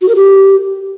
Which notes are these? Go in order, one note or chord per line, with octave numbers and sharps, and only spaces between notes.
F#4
A#4
G4